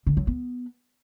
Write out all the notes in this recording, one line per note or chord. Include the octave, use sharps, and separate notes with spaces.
D3
F#3
B3